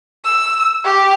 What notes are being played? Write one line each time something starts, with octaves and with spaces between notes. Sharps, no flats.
E6
G4